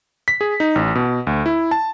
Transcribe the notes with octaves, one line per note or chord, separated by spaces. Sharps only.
B6
G#4
D#4
A1
B2
D2
E4
A5